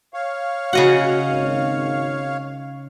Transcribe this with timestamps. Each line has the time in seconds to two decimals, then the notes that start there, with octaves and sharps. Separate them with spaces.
0.14 C#5 F5
0.73 C#3 F#4 D#5 F#5
1.28 G#1